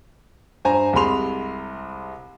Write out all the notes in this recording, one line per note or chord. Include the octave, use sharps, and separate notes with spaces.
G2 C5 G#5 A#5
C2 C3 G#3 B5 C6 F7